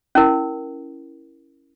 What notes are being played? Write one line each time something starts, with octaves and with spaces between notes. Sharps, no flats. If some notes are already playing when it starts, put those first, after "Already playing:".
C#4 E4 A#4